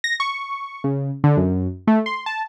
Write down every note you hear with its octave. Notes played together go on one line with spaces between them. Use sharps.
A#6
C#6
C#3
D3
F#2
A3
C6
A5